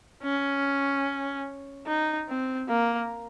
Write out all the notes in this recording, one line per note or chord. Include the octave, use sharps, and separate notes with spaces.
C#4
D#4
C4
A#3